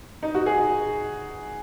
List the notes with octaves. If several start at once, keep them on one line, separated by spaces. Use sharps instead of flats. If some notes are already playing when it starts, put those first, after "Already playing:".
D#4
F#4
G#4